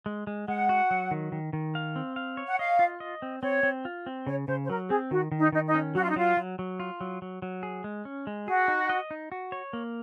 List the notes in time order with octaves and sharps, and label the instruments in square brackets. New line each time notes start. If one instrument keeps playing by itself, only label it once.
[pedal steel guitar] G#3
G#3
[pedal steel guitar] G#3 [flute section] F#5
[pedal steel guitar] F#4
F#3
D#3
D#3
D#3
F5
C4
F5
C#5
[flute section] F#5
[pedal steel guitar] D#5 [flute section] F5
[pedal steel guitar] F4
D#5
C4
[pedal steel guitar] C4 [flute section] C#5
[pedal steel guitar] C4
F4
C4
[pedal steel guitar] C#3 [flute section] C#5
[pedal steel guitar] C#3 [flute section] C5
[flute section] C5
[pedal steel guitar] F#3 [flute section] A#4
[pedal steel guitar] C4 [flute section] G#4
[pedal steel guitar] D#3 [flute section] F#4
[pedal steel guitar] D#3
[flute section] D#4
[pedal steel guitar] D#3 [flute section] D#4
[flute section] D#4
[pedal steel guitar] C#4
[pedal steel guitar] F#3 [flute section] F#4
[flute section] F4
D#4
[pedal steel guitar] F#3 [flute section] F4
[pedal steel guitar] F#3
F#3
F4
F#3
F#3
F#3
G#4
G#3
C#4
G#3
[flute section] F#4 [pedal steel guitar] G#4
[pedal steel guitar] D#4
D#5
D#4
F#4
C#5
A#3